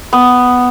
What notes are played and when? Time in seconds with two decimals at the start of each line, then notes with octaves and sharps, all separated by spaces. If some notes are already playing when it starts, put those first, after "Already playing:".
0.13 B3